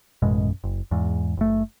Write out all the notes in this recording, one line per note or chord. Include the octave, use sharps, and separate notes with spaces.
A1 F#2 B2 G#3
F#1
E2 G#2
F#1 A3